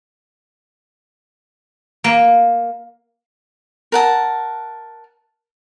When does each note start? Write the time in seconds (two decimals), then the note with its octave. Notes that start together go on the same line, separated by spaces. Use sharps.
2.04 A#3
3.92 A#4 F#5 A5